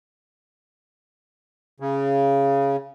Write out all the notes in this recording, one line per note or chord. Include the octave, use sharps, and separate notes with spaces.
C#3